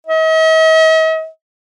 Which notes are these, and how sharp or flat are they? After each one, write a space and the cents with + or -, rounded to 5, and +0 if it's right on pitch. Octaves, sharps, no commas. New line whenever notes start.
D#5 +45